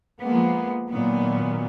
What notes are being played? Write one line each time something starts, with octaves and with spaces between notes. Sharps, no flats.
F3 G#3 A#3 B3
A#2 D#3 F#3 B3